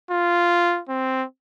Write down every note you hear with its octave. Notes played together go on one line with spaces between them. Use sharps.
F4
C4